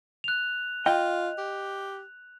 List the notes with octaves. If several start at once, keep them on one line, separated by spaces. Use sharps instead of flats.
F#6 F7
F4 D#5 G5
G4